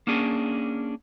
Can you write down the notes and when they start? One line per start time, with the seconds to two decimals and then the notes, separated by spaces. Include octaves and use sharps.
0.07 A#3 C#4 D4 G#4